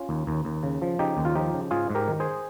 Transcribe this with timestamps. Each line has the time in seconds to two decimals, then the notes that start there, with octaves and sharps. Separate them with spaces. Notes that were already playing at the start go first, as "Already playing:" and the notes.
Already playing: C#4 F4
0.09 D#2
0.27 D#2
0.45 D#2
0.63 C#3
0.82 F3
0.99 C#3 D#4 G4
1.17 D#2
1.25 F4
1.35 F3 D#4 G4
1.54 C#3
1.71 G#2 F4 G#4
1.90 G#2
1.95 G4 A#4
2.08 D#3
2.20 G#4 C5